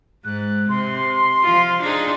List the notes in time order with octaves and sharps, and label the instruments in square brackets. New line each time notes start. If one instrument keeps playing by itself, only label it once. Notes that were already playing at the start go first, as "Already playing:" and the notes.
[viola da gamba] G#2 [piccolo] F#6
[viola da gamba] C3 [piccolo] C6
[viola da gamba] F3 F4
D4 D#4 G#4